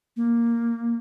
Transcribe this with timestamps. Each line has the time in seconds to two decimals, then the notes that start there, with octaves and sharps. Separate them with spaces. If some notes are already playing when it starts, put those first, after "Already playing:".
0.16 A#3